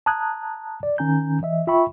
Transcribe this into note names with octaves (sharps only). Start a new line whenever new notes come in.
A5 A#5 D#6 F#6 G#6
D5
D#3 C#4 G#5 A#5 G6
E3 D#5 E5
F4 E5 G5 B5 C#6